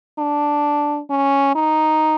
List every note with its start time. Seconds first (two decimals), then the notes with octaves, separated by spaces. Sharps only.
0.19 D4
1.10 C#4
1.55 D#4